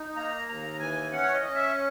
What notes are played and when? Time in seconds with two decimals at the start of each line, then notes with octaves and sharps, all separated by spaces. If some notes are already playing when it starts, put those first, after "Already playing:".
Already playing: D#4
0.16 A#3 A#5
0.48 D#2 A#5
0.80 E3 G#5
1.12 C#4 F#5
1.23 C#5
1.34 D#5
1.44 C#4
1.55 E5